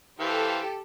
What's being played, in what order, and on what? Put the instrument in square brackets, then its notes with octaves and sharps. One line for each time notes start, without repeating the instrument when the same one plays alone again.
[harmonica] E3 C5 F5 [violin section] G4 A4